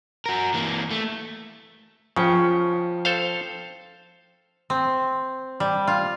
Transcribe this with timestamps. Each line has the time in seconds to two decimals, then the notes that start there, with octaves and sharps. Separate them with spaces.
0.26 F#4 A#4
0.54 E3 A#3
0.91 A3
2.16 C#3 F3 C#4 G5 C#7
3.05 A4 C5 F5
4.70 C4
5.60 G3
5.87 F4